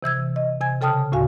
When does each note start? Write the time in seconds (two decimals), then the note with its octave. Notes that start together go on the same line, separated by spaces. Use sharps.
0.03 C3 E3 E6 G#6
0.36 D#5
0.61 C3 G#5 G#6
0.81 C#3 A4 G5 A5 D#6 F6
1.12 D2 A2 C#3 F#4 F5 G#5